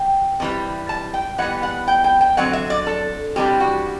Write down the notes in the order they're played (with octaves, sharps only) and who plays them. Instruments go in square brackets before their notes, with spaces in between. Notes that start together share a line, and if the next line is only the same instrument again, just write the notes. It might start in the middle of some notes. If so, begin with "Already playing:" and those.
Already playing: [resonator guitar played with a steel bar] G5
C3 E3 G3
A5
G5
E3 G3 B3 F#5
F#5
G5
G5
G5
D3 F#3 C4 F#5
E5
D5
A4
C3 E3 G3 D4 G4
F#4